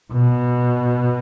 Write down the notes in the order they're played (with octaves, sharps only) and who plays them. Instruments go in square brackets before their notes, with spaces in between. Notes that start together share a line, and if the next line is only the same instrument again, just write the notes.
[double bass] B2